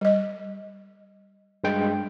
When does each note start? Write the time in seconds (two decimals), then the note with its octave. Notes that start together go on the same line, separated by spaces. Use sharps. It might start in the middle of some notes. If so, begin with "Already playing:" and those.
0.01 G3 D#5
1.64 G2 G#3 G5